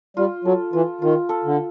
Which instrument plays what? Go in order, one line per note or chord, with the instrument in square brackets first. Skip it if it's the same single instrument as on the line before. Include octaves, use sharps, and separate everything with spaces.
[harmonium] G3 [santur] F4
[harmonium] F#3 [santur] A4
[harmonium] E3 [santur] F4
[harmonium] D#3 [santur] F4
[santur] A4
[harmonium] D3